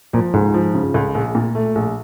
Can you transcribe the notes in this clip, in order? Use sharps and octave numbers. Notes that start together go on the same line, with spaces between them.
A#2 F3
C#2 G#2
F3
C#3
C#2
A#1
A#2
A3
A#1